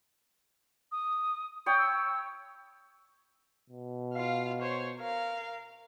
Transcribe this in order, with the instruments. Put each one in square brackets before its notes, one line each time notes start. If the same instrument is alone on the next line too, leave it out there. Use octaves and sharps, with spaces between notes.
[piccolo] D#6
[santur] C#5 G5 B5 [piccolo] D#6
[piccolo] E6
[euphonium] B2
[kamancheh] F4 F5
C5 C#5
A#4 F5